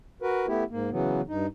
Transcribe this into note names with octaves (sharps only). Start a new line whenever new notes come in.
F#4 A#4 B4
A3 B3 E4 G4
G#2 A#3
C#3 E3 F#3 B3
G2 D#4